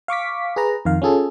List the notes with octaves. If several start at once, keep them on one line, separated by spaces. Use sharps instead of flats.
F5 C#6 D6 B6
G#4 B4 A#5
F2 D#3 F5
C#4 F4 G#4 A4